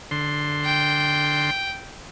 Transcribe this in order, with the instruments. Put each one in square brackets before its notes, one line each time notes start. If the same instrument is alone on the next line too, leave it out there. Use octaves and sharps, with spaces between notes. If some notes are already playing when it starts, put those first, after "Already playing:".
[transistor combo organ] D3 C6
[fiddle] G5